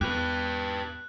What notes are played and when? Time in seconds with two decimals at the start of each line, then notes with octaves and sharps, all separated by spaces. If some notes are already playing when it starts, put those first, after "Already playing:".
0.01 E2 G4 B4 F#6